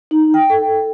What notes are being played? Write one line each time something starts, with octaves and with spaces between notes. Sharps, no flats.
D#4
G5
A4